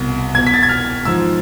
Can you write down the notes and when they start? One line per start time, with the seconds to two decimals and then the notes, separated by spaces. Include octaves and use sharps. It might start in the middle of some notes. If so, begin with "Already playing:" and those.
Already playing: C2 B2
0.34 E2 B2 G#6
0.46 B6
0.54 A6
0.63 G#6
0.69 F6
1.05 G#2 F3 E6